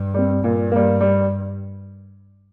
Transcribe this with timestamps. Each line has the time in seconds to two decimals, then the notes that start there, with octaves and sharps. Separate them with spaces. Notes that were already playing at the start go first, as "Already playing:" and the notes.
Already playing: G2
0.14 G3 C4
0.43 G2 A#2
0.72 G3 A#3
1.01 G3